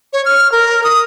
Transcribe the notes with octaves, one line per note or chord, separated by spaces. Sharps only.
C#5
F6
A#4
D#6